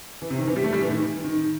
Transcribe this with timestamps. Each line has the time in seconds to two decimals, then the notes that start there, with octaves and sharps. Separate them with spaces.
0.22 E3
0.30 C3
0.38 D#3
0.48 E3
0.56 G3
0.64 A3
0.73 G3
0.82 E3
0.90 D#3
1.24 D#3